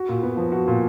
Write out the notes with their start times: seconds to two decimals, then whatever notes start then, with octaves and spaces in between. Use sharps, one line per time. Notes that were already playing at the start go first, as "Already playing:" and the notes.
Already playing: F#4
0.09 A#2
0.23 B3
0.37 F3
0.52 F#4
0.68 A#2